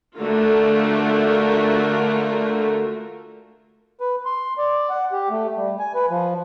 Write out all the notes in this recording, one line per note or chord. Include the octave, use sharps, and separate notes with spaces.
D3 A3 F4 F#4 A#4
B4
C6
D5
F#5
G4
A3
G3
G#5
B4
F3